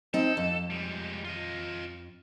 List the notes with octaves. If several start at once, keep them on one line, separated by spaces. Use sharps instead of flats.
C4 D#4 A4
F2
G3 G#3
F4 D#5